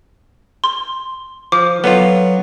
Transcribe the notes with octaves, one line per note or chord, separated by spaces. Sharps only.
C6
F3 D6
F#3 B3 F4 A4